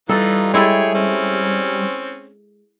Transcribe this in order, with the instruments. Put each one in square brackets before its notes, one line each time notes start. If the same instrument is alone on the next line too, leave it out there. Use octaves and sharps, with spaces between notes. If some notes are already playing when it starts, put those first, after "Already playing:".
[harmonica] E3 D#4 F4 [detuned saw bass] G3 [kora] A4
[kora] G#3 E4 A4 [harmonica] G#4 C#5 G5
[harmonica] C4 C#4